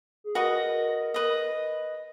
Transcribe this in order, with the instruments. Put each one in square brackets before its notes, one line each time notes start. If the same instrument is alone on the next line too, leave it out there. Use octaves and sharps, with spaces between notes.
[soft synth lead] G#4
[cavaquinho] F#4 B4 D#5 [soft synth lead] A#4
[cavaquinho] B4 D#5